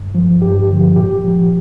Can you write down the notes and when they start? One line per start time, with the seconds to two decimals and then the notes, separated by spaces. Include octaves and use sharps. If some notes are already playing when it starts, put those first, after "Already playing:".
Already playing: G2
0.15 F3
0.41 G2 G4
0.70 D3 F3
0.96 A#2 G4
1.24 F3